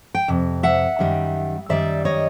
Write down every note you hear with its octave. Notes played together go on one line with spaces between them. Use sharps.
G5
F2 C3
E5 F#5
F#2 D#3 G3
F#2 D#3 G3 D5 E5
C#5 D#5